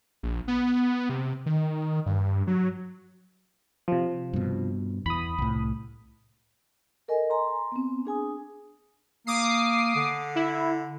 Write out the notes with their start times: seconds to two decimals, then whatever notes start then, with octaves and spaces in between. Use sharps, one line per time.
0.23 A#1
0.48 B3
1.09 C3
1.46 D#3
2.06 G2
2.47 F#3
3.88 C3 F3
4.33 G2 B2
5.06 E2 E3 B5 D#6
5.38 C2 A2
7.08 A4 A#4 D#5 G#5
7.30 G#5 A#5 C6
7.72 B3 C4
8.05 D4 G#4 G#5 D#6
9.27 A#3 D6 D#6 C7
9.95 D3
10.36 E4